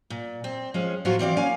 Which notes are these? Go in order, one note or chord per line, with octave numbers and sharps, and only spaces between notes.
A#2
C4
F3 G#3 C#4
A2 F3 F#3 B3 F4 F#4
E3 C4 D5 F5
A#3 C#4 F5 G#5